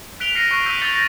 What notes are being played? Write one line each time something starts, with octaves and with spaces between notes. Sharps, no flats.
F#6 B6 D7 F7 G7
F6 A#6 C7 C#7 D#7
C#6 F#6 B6 D#7
E6 G6 B6 D7 D#7
C#6 G6 A6 C#7 F7 G7
A#6 B6